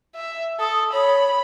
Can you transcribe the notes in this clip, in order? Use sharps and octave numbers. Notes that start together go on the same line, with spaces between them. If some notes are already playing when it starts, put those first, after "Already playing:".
E5
A4 D#6
C#5 B5